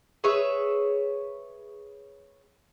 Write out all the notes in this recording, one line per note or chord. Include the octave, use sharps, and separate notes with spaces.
G#4 B4 C#5 E5